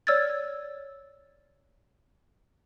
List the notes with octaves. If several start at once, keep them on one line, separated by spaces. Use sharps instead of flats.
C#5 D5 E6 F6 G#6 A6